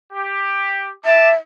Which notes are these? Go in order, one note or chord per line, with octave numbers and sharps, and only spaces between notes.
G4
E5 A5 D6